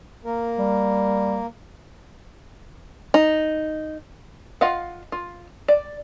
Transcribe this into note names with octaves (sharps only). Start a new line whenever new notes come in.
A#3 A#4
G3
D#4
F4 D#5 F5 F#5
F4
D5